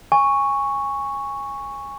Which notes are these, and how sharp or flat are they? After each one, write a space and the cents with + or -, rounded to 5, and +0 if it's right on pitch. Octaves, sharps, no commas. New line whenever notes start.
G#5 -15 C#6 +0